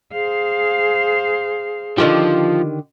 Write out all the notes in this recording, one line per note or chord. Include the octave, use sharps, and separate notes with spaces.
G#4 C5 F5
D3 D#3 F3 G4